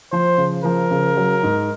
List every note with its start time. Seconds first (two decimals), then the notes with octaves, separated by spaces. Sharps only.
0.12 F3 C5
0.38 C#3
0.64 F3 A#4
0.91 C#3
1.17 F#3
1.43 G#2